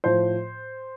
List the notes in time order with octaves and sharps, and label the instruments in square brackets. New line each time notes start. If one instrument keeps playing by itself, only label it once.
[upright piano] A2 F3 C5